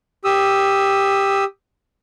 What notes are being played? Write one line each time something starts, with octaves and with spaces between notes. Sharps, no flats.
G4 D#6 E6